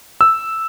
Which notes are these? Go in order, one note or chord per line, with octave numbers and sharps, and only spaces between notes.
E6